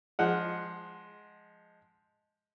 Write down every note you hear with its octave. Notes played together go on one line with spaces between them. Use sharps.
F3 G#3 F#5